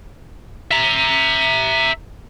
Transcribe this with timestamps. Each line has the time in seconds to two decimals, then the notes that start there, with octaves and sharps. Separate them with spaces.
0.71 E5 A#5